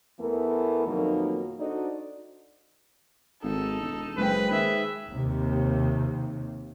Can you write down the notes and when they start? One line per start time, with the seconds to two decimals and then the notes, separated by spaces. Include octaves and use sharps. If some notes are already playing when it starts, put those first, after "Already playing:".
0.20 E2 E3 A3 B3 A#4
0.86 F2 B2 D#3 F#3 A#3 D#4
1.60 D4 D#4 F#4 A4 C5 D5
3.43 G#1 D#4 A4
3.81 E1
4.17 F#1 G#3 B4 C5 G5
4.50 D#3 G#4 B4 E5
5.11 D#2 C3